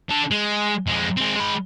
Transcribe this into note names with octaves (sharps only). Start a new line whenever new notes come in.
D3 A4
G#3
F2 G#3
G#3 C4
G#3 B5